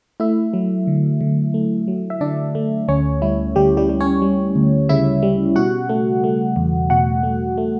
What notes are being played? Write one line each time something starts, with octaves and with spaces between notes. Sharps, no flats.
A3 E4 E5
F#3
D3
D3
A3
F#3
E5
D3 D4 D5
A3
D2 C#4 C#5
G3 E4
D2 G3 G4
G3 G4
G3
C#4 C#5
G3
D2
C#3 E4 E5
G3
B2 F#4 F#5
A3
A3
E2
B2 F#4 F#5
A3
A3